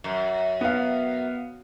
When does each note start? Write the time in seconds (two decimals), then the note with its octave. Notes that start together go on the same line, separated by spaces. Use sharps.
0.04 F#2
0.61 B3 F5